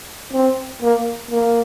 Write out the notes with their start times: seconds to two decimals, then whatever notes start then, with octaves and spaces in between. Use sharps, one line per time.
0.33 C4
0.82 A#3
1.31 A#3